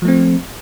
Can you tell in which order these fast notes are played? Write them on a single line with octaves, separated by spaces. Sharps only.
F3 A3 C4